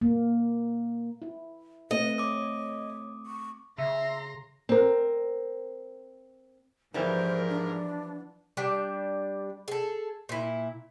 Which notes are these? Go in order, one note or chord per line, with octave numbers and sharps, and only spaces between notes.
A#3
E4
A3 C4 B4 D#5
C#5 D6 D#6
C#6
C#3 E5 A#5 C6
C4 A#4
G#2 E3 F3 G3 B3 A#4 C5
D4
G3 D4 G5
G#4 A4
A#2 E4